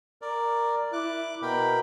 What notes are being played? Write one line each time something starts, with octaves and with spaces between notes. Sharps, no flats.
A#4 D5
E4 D6 F#6
B2 A#4 G5 B5